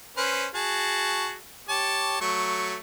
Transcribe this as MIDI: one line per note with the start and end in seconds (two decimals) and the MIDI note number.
0.17 0.47 61
0.17 0.47 71
0.17 0.47 72
0.55 1.36 66
0.55 1.36 68
0.55 1.36 81
1.69 2.17 67
1.69 2.17 73
1.69 2.17 81
2.21 2.79 54
2.21 2.79 57
2.21 2.79 85